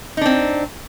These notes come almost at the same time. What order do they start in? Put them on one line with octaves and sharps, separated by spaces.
D#4 D4 C4